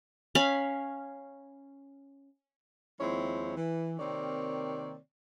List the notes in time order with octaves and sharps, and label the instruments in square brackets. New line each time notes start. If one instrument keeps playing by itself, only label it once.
[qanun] C#4 F5 B5
[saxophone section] D#2 F3 G#3 C4 E4 C#5
E3
C3 D#3 A#3 C4 C#5 D5